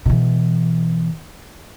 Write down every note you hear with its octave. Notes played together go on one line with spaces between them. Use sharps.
B2 E3